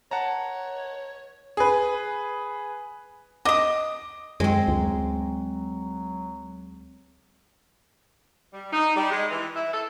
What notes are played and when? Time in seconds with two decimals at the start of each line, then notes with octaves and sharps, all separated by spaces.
0.11 C#5 F#5 A5 A#5
1.57 G#4 B4
3.45 D#5 D6 D#6
4.40 F#2 G#3 C4
4.68 D2 F#3
8.53 G3
8.73 D#4
8.96 G3
9.11 G#3
9.31 E3
9.56 E4
9.73 A4